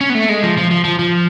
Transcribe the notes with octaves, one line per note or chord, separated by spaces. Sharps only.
C#4
B3
A3
G#3
F3
F3
F3
F3
F3